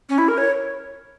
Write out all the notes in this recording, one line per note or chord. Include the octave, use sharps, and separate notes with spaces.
C#4
E4
A#4
C#5